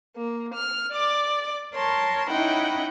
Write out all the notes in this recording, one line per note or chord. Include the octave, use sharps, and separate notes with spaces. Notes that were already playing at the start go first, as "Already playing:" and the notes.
A#3
F6
D5 D6
A#4 C#5 A5 C6
C#4 D#4 E4 F#5 G5 B5